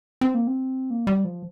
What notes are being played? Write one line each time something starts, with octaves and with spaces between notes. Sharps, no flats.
C4
A#3
C4
A#3
G3
F3